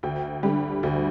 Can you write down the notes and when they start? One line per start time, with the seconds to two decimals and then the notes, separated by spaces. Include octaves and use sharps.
0.03 D2 G5
0.43 D3 G3
0.83 D2